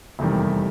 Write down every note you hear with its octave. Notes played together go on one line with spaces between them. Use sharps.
F1 E2 C3 D#3 G3